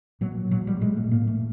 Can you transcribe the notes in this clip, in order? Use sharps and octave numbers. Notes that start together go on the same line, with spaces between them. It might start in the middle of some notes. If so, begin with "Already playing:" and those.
A#2 F#3
A#2 F#3
G3
A#2 G#3
A3
A2 A#3
A3